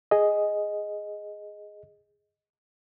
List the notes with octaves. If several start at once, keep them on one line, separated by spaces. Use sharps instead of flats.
G#4 D#5